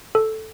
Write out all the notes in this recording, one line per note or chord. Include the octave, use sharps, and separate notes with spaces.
A4